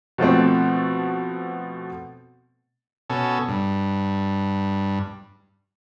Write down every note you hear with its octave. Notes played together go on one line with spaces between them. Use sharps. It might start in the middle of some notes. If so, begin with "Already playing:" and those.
B2 F3 A3 C4
B2 C#4 A4
G2